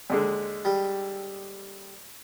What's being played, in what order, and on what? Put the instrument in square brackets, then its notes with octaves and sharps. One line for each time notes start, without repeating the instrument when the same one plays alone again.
[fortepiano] D#2 D3 G#3
[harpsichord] G3